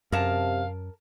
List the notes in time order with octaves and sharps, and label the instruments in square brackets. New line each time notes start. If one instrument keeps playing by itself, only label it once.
[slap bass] F#2 [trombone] C3 [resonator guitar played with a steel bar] A#4 A5 [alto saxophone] F5